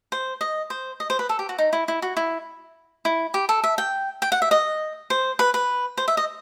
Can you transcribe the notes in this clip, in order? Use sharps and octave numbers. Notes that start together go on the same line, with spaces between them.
C5
D#5
C5
D#5
C5
B4
A4
G4
F#4
D#4
E4
E4
F#4
E4
E4
G4
A4
E5
G5
G5
F#5
E5
D#5
C5
B4
B4
C5
E5
D#5